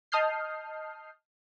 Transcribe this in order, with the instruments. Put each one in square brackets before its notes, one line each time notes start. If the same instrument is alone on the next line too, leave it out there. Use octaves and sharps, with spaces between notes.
[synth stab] D#5 A5 D#6 F6 G6 C7